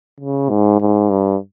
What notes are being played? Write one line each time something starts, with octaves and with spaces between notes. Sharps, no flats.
C#3
G#2
G#2
G2